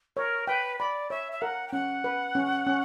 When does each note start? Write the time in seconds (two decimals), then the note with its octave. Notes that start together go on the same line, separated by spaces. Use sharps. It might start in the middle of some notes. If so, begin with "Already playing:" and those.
0.17 A#4 C#5
0.47 B4 G5
0.79 D5 B5
1.10 C#5 E5
1.32 E5
1.42 A#4 F#5
1.68 G5
1.73 C#4 F#5
2.04 B4
2.35 C#4
2.67 C#4